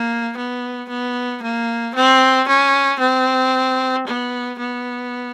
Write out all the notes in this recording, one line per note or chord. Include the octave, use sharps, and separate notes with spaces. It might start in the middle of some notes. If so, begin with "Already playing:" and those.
Already playing: A#3
B3
B3
A#3
C4
C#4
C4
B3
B3